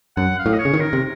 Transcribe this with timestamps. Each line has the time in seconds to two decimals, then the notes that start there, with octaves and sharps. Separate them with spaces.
0.17 F#2 F#5
0.39 F5
0.46 A2
0.54 D#5
0.59 C#5
0.65 C#3
0.74 D#3
0.81 A#4
0.93 C3